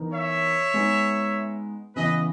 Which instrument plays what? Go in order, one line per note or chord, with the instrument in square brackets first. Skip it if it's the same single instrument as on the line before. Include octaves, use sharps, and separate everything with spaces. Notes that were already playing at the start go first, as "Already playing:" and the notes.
Already playing: [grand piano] E3 B3 D#4 A#4
[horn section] C#5 E5
[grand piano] G#3 B3 D#4
[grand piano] C#3 E3 B3 [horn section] B4 D#5